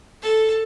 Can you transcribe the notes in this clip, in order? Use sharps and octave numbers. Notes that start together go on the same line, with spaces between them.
A4